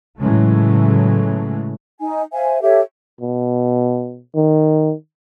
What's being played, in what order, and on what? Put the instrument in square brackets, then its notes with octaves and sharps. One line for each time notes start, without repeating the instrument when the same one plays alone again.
[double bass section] A2 C#3 E3 F#3 G#3 A3
[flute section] D#4 G#5
C5 E5 F5 G#5
G4 A4 C#5 E5
[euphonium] B2
D#3